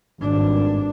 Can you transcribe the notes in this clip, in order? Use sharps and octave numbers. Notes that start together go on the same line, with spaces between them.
G#1 G2 D4